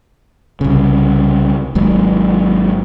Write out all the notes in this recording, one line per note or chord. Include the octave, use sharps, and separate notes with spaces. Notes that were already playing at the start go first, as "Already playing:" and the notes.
C2 C#3
G#1 G#2 F#3